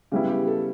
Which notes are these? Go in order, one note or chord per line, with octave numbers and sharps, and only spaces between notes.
C#3 G3 B3 E4 G4
G4
A4